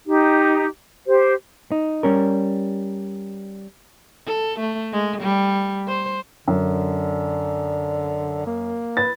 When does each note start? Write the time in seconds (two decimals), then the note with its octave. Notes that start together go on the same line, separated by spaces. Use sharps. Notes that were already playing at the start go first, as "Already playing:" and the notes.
0.06 D#4 G4
1.07 G4 C5
1.72 D#4
2.03 G3 C#4 A#4
4.27 A4
4.59 A3
4.92 G#3
5.22 G3
5.88 C5
6.48 F#2 D3
8.47 A#3
8.97 B4 A6